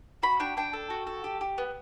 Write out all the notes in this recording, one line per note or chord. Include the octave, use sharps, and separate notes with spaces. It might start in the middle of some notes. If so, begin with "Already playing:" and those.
F#4 B5
D4 G5
D4 G5
A4
F#4
A4
G4
G4
B3